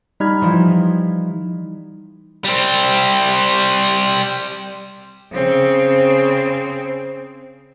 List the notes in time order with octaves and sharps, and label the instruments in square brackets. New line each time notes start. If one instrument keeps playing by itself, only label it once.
[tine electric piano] G3 D#4 [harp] B5 F6 G#6
[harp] E3 F3 E4
[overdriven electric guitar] G3 C4
[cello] C#3 C4